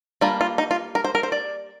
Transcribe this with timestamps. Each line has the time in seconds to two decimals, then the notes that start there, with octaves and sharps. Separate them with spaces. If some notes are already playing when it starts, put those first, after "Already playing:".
0.21 G3 A#3 D4 F4
0.41 F4
0.58 D#4
0.71 F4
0.95 A#4
1.04 C5
1.15 A#4
1.23 C5
1.32 D5